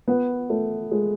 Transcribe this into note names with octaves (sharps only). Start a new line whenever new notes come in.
B3
A3
G#3